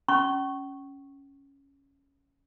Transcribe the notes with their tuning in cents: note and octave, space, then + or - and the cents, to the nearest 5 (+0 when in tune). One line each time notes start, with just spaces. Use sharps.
C#4 +0 C#6 -15